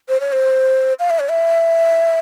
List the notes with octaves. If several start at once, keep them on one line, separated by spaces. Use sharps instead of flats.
C5
C#5
C5
F5
E5
C#5
E5